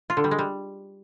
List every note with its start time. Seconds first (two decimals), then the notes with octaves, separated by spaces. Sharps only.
0.10 F4
0.17 D3
0.24 G3
0.31 G#3
0.39 G3